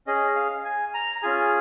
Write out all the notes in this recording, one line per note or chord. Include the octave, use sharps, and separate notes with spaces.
C#4 G#4 D#5
F5
G#5
A#5
A#5
C#4 F4 G#4 G#5